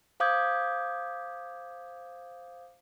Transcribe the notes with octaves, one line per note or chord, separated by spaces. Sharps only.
C5 F5 D6 D#6 G6 G#6